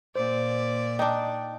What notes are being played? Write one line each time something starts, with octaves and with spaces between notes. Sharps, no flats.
A#2 C5 D5
D4 D#4 G5